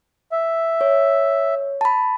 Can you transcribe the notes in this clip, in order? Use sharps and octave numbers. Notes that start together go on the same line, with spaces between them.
E5
C#5
A5 B5